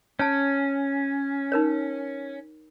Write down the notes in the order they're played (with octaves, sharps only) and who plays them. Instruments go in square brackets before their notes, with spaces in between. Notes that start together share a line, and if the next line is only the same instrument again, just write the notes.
[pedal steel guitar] C#4 [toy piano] C#5 G#5 A5
[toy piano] D#4 A#4 C#5